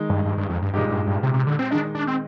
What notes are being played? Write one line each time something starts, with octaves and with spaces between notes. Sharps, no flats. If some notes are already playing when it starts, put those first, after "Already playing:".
Already playing: D#3 G#3 D#4
G2
G2
G2
F2
G2
G2 A#2 G#3 D#4 G4
G2
G2
C3
C3
D3
C4
D#3 G#3 D4 D#4
D4
C4